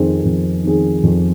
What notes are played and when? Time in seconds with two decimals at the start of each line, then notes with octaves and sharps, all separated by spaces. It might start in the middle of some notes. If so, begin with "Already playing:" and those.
Already playing: F2 D#3 C4 G#4
0.25 F2
0.64 D#3 C4 G#4
1.03 F2